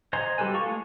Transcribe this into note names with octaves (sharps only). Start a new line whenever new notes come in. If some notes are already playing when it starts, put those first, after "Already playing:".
C5 D#5 G#5 A#5 C6
G3 G4 A4 B4 G#5
F4 A4 C#6
G#3 A3 F4